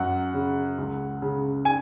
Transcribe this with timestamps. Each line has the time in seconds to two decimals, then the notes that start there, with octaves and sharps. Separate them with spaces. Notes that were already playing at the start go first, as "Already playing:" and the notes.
Already playing: F#2 F#5
0.34 C#3
0.78 C#2
1.22 C#3
1.65 G#5